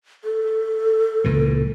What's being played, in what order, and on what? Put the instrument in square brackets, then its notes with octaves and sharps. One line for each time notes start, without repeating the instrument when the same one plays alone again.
[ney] A4
[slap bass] C#2 A#2 E3